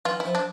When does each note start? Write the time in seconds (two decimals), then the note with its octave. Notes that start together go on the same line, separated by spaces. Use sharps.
0.05 E3 F4
0.20 E4
0.25 F3
0.35 D4